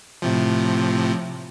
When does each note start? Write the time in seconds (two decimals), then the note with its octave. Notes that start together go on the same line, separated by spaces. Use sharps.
0.22 A2 C3 F3